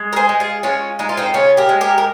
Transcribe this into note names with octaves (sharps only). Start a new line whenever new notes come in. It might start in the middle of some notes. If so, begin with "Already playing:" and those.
Already playing: G#3
A#4
G#4 C5
G#3
F4 G#4
G#3 C#4 F4
G#3 D#4
F4
C4 D#4
C#3 C#4 F4
G4 A#4
G#3
G4 A#4
A#4